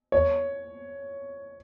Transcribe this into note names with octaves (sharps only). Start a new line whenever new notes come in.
C#5